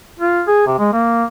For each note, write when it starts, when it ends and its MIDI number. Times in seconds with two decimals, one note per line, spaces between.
0.20 0.42 65
0.47 0.64 68
0.67 0.75 48
0.79 0.92 56
0.93 1.24 58